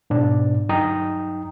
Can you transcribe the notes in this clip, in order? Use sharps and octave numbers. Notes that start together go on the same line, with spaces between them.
G#2 B2 D4
G2 F#3 D#4 G5 A#5 D#6